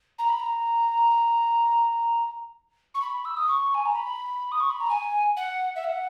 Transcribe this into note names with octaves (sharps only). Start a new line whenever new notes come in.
A#5
B5
A#5
C#6
B5
E6
D#6
C#6
G#5
A#5
B5
D#6
C#6
B5
A#5
G#5
F#5
E5
F#5